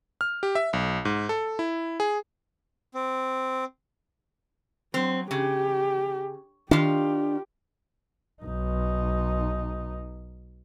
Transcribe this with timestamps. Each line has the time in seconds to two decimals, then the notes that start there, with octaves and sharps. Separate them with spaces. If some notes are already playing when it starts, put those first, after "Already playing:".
0.21 F6
0.43 G4
0.55 E5
0.73 B1
1.05 G#2
1.29 A4
1.59 E4
2.00 G#4
2.94 C4
4.94 F#3 C4
5.31 C#3 G4
6.71 D#3 D4 F4 G4
8.43 B1 D#4